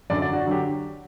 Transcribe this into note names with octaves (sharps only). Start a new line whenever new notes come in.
F#2 D3 F#3 D5
D5
F#4
D3 F#3 G4